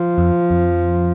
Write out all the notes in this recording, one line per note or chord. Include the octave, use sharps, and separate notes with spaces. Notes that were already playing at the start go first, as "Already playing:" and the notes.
Already playing: F3
F2
F2